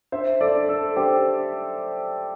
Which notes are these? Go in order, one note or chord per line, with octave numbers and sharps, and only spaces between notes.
D4 C5 E5
A4 D5
D4
A4
D4 G4 C5